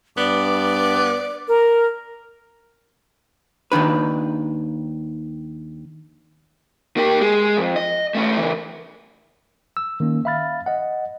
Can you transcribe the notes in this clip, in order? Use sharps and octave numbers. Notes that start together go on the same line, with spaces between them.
G2 B3 D5 D6
A#4
D#2 D#3 D4 B4
A#3 G4
G#3
F2
D#5
A3 C#4
C#3 E3
E6
D#3 A#3 C#4
E5 F5 B5 F6 A6
D#5 F#5